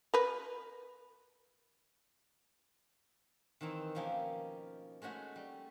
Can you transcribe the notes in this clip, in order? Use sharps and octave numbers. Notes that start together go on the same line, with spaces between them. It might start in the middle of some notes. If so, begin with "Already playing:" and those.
A#4 B4
D#3 E3 C4 D#4
B2 F3 A#3 C#4 G4
G#3 A3 C#4 F#4
G3